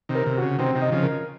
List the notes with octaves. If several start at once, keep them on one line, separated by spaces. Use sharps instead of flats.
C3 D#3
A#4
C3
C#3 F#4
C3 D#3 C4
C3 D#3
D#5
C#3 F3
A#4